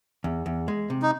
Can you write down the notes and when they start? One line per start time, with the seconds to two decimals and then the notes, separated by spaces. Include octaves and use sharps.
0.24 E2
0.46 E2
0.68 G#3
0.90 C3
1.02 D#4